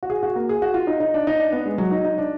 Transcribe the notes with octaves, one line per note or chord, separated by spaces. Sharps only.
F#4
G#4
F#4
A#3
G#4
F#4
F4
D#4
D#4
D4
D#4
D4
B3
G#3
F#3
D#4
D#4
D4